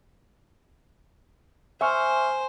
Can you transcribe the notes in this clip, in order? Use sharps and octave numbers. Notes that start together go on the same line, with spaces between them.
C5 E5 G#5 C#6 F6